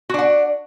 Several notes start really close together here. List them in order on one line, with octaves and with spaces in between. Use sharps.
F#4 D4 F#5